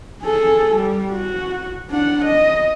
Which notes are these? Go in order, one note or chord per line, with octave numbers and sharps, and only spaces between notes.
G#4 A4
G3
F#4
D4 F#5
D#5